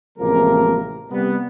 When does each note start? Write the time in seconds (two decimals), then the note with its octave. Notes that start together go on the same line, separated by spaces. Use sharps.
0.19 A1 C3 F3 G#3 A#3 A#4
1.11 C3 G3 B3